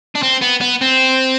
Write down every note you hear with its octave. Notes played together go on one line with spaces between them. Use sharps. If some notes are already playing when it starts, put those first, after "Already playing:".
D4
C4
B3
B3
C4